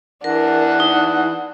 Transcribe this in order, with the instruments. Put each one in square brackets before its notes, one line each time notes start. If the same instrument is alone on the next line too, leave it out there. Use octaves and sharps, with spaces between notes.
[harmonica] E3 F#5 [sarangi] D4 [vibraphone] A#4
[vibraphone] D#4